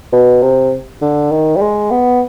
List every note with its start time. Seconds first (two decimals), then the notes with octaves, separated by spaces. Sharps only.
0.13 B2
0.42 C3
1.02 D3
1.32 D#3
1.56 G3
1.61 G#3
1.91 B3